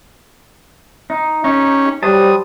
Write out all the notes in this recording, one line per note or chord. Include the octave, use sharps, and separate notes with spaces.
D#4
C#4 D#4 G4
F#3 G3 C5 A5 D#6